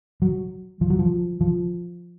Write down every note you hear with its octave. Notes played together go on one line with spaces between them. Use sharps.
F#3
F3
F#3
F3
F3